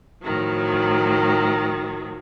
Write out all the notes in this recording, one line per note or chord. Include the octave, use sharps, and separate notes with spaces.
A2 D#3 F3 F#3